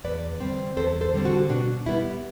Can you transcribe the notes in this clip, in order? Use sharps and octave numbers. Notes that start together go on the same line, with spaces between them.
E2 B4 D5
D3 G3 C4
E2 A4 C5
A4 C5
D3 G3 C4
F#4 A4
B2 D4 F#4
G3 B3 E4